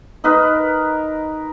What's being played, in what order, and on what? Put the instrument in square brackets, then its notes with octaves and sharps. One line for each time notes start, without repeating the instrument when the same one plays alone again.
[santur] D#4 A#4 B4 D#6